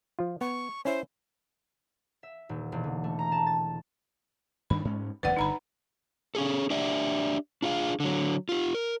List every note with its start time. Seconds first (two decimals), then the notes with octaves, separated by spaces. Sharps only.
0.19 F3 F4
0.41 B3 C#6
0.85 C#4 E4 C5 E5
2.23 E5
2.49 D#1
2.72 E1
2.84 D3
3.04 A3
3.19 A#5
3.32 A5
3.47 A6
4.70 G2 D#3 D4 B5
4.85 G#2 G#3 C#4
5.23 F#1 E2 D3 B4 D5 F#5
5.36 G1 D3 D#4 A#5 B5
6.35 C#4 G#4 A4
6.70 D4 G4 D5 E5
7.62 D4 F4 G#4 F5
8.00 D3 F#3
8.49 F4 G4
8.75 A#4